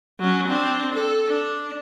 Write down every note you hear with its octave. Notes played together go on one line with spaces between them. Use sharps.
F#3 C#4
C4 D4
A4
D4